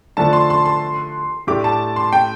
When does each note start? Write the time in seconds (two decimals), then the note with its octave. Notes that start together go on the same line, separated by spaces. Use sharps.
0.17 D3 F3 A3 D4 A5
0.33 C6
0.50 C6
0.65 C6
1.47 A2 A3 D4 G4 D6
1.64 A5
1.96 C6
2.12 G5